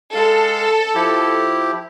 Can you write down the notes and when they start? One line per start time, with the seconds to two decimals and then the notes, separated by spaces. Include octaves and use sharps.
0.15 G#3 A4 F5
0.95 F3 E4 G4